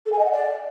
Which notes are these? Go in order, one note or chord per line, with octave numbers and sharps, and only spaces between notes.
A4
G#5
D#5
F#5
D5